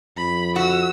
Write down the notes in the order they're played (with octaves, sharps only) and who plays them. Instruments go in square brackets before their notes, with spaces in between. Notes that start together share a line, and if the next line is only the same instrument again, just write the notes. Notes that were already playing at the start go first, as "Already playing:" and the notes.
[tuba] F2 [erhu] B5
[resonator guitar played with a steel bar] F#4 [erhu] E6